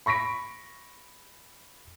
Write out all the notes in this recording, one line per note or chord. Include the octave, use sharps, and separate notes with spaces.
B5 C#6 A#6 B6 D7